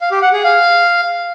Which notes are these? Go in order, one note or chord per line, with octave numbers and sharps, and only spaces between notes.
F5
G4
F#5
G#4
F5